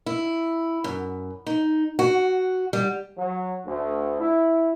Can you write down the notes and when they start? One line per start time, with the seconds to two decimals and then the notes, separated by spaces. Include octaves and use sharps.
0.06 E4
0.84 F#2
1.46 D#4
1.99 F#4
2.73 G3
3.17 F#3
3.65 D2
4.20 E4